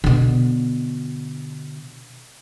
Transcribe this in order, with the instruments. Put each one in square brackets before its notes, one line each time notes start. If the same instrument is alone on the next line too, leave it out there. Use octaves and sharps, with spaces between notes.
[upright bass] B2 D3